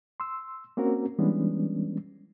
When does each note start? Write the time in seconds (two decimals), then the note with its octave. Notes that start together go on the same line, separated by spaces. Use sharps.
0.20 C6 E6
0.77 A#3 C4 C#4 F#4 A#4
1.19 E3 G3 G#3 B3 C#4 D4